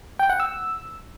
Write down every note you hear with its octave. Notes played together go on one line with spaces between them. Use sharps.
G5
F#5
E6